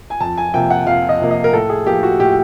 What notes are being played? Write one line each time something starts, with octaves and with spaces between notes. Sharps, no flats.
G#5
F2 A5
G#5
C3 F3 A#3 G5
F#5
F2 F5
D#5
C3 F3 A#3
D#5
A#4
A2 A4
G#4
F3 A#3 G4
F#4
A2 G4